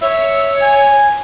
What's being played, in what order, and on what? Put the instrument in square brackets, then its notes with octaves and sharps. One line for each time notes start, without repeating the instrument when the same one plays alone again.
[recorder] C#5 [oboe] E5
[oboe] G#5